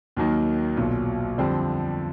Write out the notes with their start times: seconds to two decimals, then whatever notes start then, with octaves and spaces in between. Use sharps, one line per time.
0.17 D#2 D#3 F#3 A#3 D#4
0.77 B1 A#2 F#3
1.38 F2 D3 G3 C4